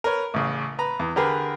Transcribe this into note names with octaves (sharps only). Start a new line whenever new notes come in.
A#4 B4 C#5
A1 C#3
B4 A#5
E2
D3 G4 G#4 A#4 B4